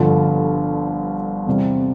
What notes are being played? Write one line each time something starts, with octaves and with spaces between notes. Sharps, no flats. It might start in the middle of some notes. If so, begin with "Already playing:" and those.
Already playing: G1 G2 D3 F3
E2 C3 G3 C4